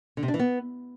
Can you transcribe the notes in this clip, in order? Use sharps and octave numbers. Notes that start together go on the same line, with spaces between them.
D3
C3
D4
E3
B3